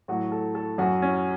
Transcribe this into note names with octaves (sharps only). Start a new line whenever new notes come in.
A2 F#3 F#4
A4
A4
F#2 F#3 F#4
C#4